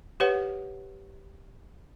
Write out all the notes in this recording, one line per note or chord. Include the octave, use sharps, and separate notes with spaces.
G4 B4 C#5 F#5